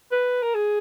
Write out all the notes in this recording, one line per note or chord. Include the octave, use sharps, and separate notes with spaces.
B4
A#4
G#4